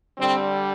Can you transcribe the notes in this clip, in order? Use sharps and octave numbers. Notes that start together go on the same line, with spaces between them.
D3 G3 C4